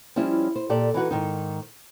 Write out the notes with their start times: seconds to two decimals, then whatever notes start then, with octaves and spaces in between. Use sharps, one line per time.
0.16 F3 G3 C#4 E4
0.56 C5
0.69 A#2 G4 A4 D5
0.94 E3 D#4 F#4 B4
1.11 G#2 D#3 D#4